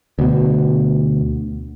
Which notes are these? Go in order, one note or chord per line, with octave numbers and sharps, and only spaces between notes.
D2 B2